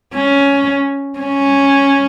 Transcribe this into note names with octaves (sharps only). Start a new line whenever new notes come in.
C#4
C#4